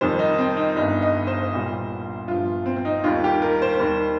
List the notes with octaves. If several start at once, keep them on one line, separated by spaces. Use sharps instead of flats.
F2 D#3 G3 C5
D#4
C4
D#4
G1 G2 G3 D#4
D#5
C5
C2 A#2 G3
G1 G2 F3 F4
C4
C4
D#4
D#2 D#3 G3 F4
G4
A#4
C5
D#2 D#3 G3